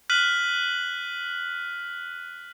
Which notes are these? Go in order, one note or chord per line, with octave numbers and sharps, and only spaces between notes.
F6 F#6 B6 D#7 F#7